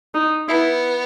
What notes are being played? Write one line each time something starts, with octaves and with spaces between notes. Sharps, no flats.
D#4
B3 E4